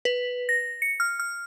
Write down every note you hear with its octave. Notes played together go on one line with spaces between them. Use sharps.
B4
A#6
C#7
F6
F6